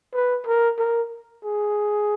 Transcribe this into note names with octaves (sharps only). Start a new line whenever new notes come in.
B4
A#4
A#4
G#4